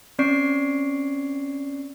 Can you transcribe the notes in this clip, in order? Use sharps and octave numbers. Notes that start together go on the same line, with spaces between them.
C4 C#4 D5 C#6 C7 D7